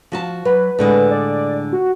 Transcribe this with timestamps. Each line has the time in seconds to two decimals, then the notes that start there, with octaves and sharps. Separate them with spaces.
0.12 F3 F#4 A5
0.45 F#3 B4
0.79 A2 D3 G#3 B4
1.11 D5
1.72 F#4